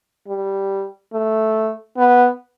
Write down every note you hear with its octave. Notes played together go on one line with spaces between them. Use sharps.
G3
A3
B3